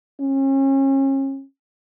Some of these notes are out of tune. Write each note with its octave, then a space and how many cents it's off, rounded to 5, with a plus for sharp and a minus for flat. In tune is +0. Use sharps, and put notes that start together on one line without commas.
C#4 -35